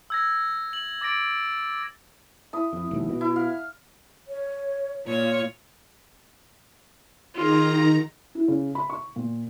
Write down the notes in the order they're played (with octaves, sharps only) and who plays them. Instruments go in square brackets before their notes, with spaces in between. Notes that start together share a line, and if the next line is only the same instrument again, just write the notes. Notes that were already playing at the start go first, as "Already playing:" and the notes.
[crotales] E6 G#6 A#6
F#7
D6 A6 A#6 D7 F#7
[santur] E4 D#6
[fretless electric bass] F2
E1 A#1 D#2
B2
[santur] E4
F5
[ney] C#5
[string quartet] A#2 C#5 [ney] F4
[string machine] D#3 A#5 [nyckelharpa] F4 G#4
[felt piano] E4
C#3
B5
C#6
A#2